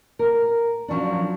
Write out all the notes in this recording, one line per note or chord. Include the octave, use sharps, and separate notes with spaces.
A#4
F3 F#3 C#4 D4